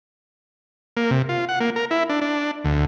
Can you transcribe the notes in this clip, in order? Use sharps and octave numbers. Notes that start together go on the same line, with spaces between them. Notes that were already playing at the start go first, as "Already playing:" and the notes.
A#3
C3
F4
F#5
A#3
A#4
E4
D4
D4
D2